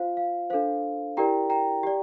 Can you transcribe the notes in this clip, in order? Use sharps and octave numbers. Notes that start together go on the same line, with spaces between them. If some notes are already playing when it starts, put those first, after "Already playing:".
Already playing: F4 C5 F5
F5
D4 A4 C5 F5
E4 G4 A#4 D5 G5 A#5
G5 A#5
G4 D5